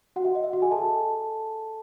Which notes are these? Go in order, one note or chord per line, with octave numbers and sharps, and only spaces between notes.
F#4 F#5
E5
D#5
E5
F#4 F#5
G#4 G#5
A4 A5